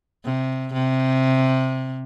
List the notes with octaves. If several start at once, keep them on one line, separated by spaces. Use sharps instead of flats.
C3
C3